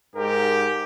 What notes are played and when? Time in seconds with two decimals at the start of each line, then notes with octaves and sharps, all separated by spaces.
0.15 G#2 G4 A#4